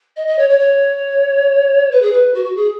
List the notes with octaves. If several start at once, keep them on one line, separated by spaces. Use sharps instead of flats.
D#5
D#5
C#5
C#5
C#5
B4
G#4
B4
F#4
F#4
G#4